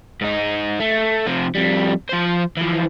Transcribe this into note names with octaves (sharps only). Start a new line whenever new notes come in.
G#2 D#4
A3
C3 F3
F2 G3
F3 C5
E3 F3